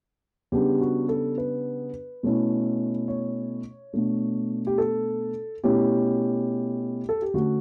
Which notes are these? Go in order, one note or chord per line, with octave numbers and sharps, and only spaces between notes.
C#3 G3 B3 D4 G4
F#4
A4
B4
B2 A3 C#4 E4
C#5
B2 A3 D4
G4
A4
B2 A3 C#4 E4 G4
A4
G4
D3 A3 C#4 F#4